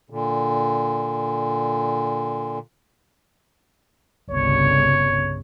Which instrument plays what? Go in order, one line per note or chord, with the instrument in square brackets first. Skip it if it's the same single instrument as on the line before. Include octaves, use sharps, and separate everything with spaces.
[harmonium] A#2 D3
[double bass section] G1 C2 C#3 [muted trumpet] C#5